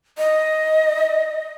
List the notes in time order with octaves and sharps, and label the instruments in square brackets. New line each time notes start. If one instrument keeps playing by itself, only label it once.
[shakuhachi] D#5